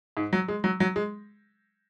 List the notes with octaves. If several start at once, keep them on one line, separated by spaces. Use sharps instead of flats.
G#2
F#3
G#3
F#3
F#3
G#3